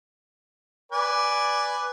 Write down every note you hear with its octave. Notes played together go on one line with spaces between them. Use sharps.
B4 D5 G#5